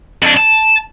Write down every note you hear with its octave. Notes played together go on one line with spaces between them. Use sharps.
F2 D4
A5